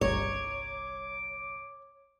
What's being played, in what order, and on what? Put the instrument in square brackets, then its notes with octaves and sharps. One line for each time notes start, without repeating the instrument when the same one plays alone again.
[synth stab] G1 C2 A#5 [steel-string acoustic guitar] C#5 [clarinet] D6